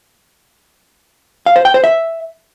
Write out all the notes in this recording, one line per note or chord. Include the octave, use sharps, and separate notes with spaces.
F5
C5
G5
C5
E5